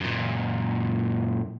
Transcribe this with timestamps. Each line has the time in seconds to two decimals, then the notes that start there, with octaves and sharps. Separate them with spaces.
0.01 F#2 A#2